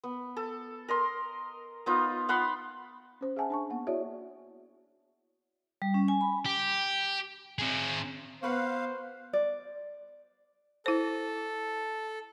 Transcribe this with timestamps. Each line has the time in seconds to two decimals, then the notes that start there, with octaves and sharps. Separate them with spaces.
0.04 B3
0.37 A4
0.88 A#4 D#5 C6
1.86 B3 D#4 F4
2.29 F5 F#5 B5 C6
3.21 C#4 C5
3.36 G#4 E5 F#5 G#5 A5
3.50 D4 A5 C#6
3.70 A#3 B3 F#5
3.87 E4 F#4 G#4 C#5 D5 E5
5.82 G3
5.94 C#4
6.08 G#5
6.21 B5
6.46 G4
7.59 C4 G#4
8.43 B3 F#4 B4 C5 F5 F#5
9.33 D5
10.86 E4 A4 C5